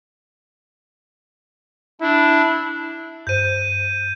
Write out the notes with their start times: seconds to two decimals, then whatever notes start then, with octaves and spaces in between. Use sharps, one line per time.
2.02 D4 E4
3.27 G2 C5 G6 D#7